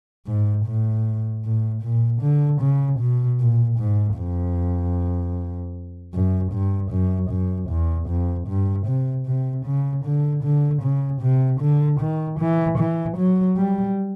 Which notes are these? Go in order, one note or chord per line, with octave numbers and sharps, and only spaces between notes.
G#2
A2
A2
A#2
D3
C#3
B2
A#2
G#2
F2
F#2
G2
F#2
F#2
E2
F2
G2
C3
C3
C#3
D3
D3
C#3
C3
D3
D#3
E3
E3
F#3
G3